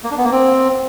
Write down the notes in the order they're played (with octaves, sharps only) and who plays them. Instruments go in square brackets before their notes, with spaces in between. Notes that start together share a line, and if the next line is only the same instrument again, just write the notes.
[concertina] A#3
D4
B3
A#3
C4